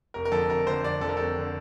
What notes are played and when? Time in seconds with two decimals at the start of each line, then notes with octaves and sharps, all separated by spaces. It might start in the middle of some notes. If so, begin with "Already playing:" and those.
0.14 F1 A#4
0.25 A#4
0.32 F2 D3 A4
0.50 F1 A#4
0.67 F2 D3 C5
0.83 F1 D5
1.01 F2 D3 A4
1.09 A#4
1.17 F1 A4
1.39 D3